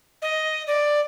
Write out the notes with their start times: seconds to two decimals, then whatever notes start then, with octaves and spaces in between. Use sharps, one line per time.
0.22 D#5
0.67 D5